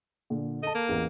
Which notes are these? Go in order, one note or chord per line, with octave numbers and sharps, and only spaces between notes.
A#2 D3
A4 D#5 A5
A#3
A1 E2